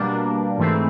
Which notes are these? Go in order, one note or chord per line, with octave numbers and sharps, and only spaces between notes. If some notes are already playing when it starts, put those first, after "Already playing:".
Already playing: B2 G3 A#3 D4
G#2 E3 A3 C4